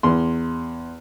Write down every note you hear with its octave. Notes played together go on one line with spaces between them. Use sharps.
E2 C6